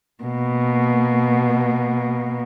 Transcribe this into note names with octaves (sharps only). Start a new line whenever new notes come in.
B2 A#3